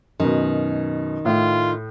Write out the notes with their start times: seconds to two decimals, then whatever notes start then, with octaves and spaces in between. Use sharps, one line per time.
0.20 F#2 B2 D#3
1.25 A2 F4